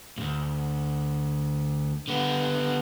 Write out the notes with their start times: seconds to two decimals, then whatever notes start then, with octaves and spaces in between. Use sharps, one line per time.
0.18 D2 G#2
2.08 D3 B3